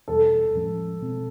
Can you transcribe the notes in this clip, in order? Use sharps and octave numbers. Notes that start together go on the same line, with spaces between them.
E2 B2 G3 A4
A2 F3 G#3 C#4
B2 G#3 C4